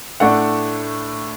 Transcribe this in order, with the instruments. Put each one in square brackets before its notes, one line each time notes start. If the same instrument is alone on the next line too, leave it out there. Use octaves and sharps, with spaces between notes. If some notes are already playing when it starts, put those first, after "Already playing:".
[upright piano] A2 A3 D4 F#5